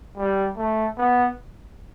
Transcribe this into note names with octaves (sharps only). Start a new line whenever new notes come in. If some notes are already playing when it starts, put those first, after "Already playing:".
G3
A3
B3